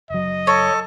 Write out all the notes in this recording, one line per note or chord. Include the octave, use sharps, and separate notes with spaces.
F#1 F#3 D#5
A4 C#5